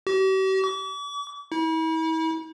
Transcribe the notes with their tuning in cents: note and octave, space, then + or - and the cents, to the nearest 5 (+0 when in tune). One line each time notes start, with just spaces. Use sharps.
G4 -45
D6 -45
E4 -40